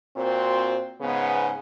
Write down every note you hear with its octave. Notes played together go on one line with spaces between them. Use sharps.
A#2 C4 F#4 C5
G#2 C#3 B3